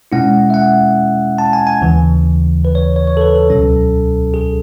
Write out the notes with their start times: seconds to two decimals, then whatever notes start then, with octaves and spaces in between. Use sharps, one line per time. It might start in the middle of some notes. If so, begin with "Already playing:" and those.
0.12 B2 G#3 C#4 E4 F#5
0.50 E5
0.54 F#5
1.38 A5
1.53 G#5
1.67 G#5
1.81 D#2 C#3 E3
2.65 B4
2.75 C#5
2.96 C#5
3.07 C#5
3.17 A4
3.21 B4
3.35 A4
3.50 C#2 B2 F#3 C#4
4.34 G#4